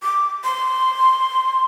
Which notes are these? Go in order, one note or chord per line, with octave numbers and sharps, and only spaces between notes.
D6
C6